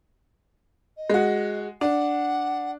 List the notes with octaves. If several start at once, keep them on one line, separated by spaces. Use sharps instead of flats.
D#5
G#3 F#4
D4 F#5